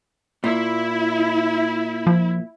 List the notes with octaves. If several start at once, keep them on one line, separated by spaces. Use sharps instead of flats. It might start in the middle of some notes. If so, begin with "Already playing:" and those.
A#2 E4
F3